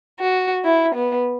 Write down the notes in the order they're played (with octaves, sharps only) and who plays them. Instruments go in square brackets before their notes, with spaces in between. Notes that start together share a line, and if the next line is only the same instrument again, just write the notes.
[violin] F#4
E4
B3